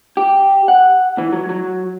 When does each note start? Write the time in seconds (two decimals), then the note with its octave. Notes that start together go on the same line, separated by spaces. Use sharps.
0.17 G4
0.68 F#5
1.18 E3
1.33 F#3
1.49 F#3